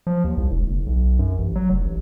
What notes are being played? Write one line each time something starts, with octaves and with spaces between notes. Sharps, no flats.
F3
D#2
C2
E1
F#1
B1
F#2
A1
F#3
F1
A1